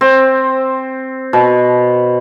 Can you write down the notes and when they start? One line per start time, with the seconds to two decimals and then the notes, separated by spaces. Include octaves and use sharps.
0.01 C4
1.33 B2